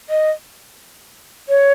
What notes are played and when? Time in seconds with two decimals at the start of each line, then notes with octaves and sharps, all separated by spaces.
0.10 D#5
1.49 C#5